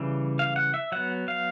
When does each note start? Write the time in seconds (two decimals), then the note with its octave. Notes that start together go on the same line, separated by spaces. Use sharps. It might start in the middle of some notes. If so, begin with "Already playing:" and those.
Already playing: C#3 E3 G3
0.39 F5
0.56 F#5
0.74 E5
0.92 F#3 B3 F#5
1.28 F5